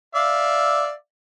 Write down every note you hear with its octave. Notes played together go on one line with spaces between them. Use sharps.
D5 E5 F5